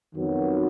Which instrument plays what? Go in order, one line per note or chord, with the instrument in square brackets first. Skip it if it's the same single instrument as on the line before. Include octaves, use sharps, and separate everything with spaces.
[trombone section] F2 D#3 F#3 B3 F#4